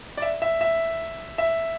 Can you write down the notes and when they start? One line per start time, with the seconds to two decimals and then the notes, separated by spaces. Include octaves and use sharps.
0.17 D5
0.22 E5
0.42 E5
0.61 E5
1.38 E5